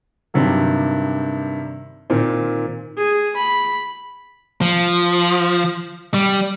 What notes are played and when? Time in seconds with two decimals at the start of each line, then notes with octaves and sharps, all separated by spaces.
0.34 G2 C3 D#3 F#3
2.10 A#2 D#3 C4
2.97 G#4
3.36 B5
4.61 F3
6.14 G3